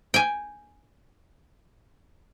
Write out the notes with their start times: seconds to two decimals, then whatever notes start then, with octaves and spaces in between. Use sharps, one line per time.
0.14 G5 G#5